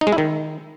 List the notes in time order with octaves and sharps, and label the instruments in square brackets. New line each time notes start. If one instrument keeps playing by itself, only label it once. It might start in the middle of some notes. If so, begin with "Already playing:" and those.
[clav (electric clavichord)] D#4
G#3
E4
D#3